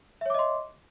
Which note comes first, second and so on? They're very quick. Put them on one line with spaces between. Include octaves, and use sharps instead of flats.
E5 C#5 D6 D#5 C6